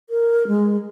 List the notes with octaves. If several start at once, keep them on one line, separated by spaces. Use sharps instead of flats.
A#4
G#3